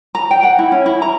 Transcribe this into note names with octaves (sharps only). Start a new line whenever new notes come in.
A#5
G5
F#5
E4
C#4
E4
A#5